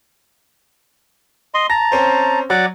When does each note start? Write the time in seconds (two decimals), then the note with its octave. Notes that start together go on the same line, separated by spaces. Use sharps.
1.54 D#5 C6
1.70 A5 A#5 A#6
1.92 C4 C#4 C5
2.50 F#3 D5 F#5 D6